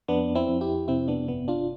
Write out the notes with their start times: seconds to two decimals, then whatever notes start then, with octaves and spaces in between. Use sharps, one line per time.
0.08 F2 B3 D4
0.35 C4 E4
0.48 F2
0.61 E4 G4
0.88 C3 C4 E4
1.08 B3 D4
1.28 G1 B3
1.48 D4 F4